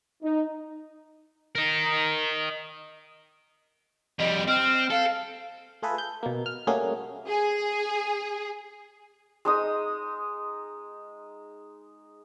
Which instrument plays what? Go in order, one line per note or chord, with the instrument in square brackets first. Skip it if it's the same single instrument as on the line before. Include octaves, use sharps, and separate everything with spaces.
[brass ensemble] D#4
[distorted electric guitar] A#4 D#5
[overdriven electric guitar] F2 G3 [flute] D#5
[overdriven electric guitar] C4 [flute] F6
[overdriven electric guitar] A4 [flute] F5
[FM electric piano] A3 F4 G#4 A4 B4
G6
B2 A#3
F6
G3 A3 A#3 C#4 F#4 G#4
[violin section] G#4
[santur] G#3 D#4 D#6